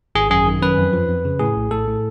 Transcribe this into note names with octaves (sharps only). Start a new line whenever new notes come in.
G#1 G#4
F#2 G#4
D#3
F#2 B4
F2
F3
F2
C#3
A2 G#4
A#1
A2 A4
A2